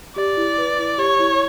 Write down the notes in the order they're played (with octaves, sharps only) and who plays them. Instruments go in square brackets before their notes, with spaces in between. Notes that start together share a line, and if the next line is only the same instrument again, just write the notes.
[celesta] G4 [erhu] D5
[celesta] E4
B4
E4
[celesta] G4 [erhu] C#5
[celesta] E4